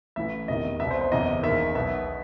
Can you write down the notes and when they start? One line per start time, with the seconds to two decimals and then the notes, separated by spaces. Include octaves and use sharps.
0.16 A1 A2 E3 E5
0.48 E1 E2 C3 D#3 D#5
0.80 C2 B2 E5
0.91 C5
1.01 C5
1.12 F#1 E2 C3 E3 D#5
1.43 E1 D#2 D#3 E5
1.75 B1 B2 E5